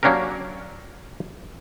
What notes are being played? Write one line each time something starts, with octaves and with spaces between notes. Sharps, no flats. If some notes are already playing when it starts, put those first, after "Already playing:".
F#3 A#3 C#4 D4 G4 A#4